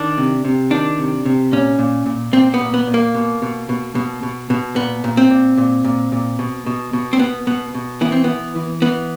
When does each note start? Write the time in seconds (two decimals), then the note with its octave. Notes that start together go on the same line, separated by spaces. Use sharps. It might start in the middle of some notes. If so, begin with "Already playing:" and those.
Already playing: D#3 D4
0.18 C3
0.45 C3
0.70 D#3 D4
0.98 C3
1.26 C3
1.52 A#2 C#4
1.79 A#2
2.06 A#2
2.33 A#2 C4
2.54 B3
2.61 A#2
2.74 B3
2.87 A#2
2.94 A#3
3.14 B2
3.42 B2
3.69 B2
3.95 B2
4.23 B2
4.50 B2
4.76 A#2 B3
5.04 A#2
5.17 C4
5.30 A#2
5.57 A#2
5.85 A#2
6.12 A#2
6.39 B2
6.66 B2
6.93 B2
7.13 C4
7.19 B2 B3
7.47 B2 B3
7.75 B2
8.01 E3 B3
8.12 C4
8.24 E3 B3
8.56 E3
8.82 E3 B3